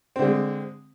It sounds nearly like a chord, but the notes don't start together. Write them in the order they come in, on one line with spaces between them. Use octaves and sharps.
C4 D3 G#3